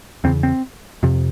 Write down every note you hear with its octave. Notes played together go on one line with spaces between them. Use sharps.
E2 C#3 C4
C4
F2 C3